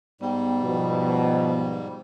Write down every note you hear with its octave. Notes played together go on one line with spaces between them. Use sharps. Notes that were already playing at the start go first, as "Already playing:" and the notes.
G#2 G3 B3 G5
B2 F3